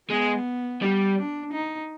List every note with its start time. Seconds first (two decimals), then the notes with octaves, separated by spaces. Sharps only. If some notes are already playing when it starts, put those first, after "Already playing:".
0.10 G#3 B3
0.82 G3
1.18 D4
1.53 D#4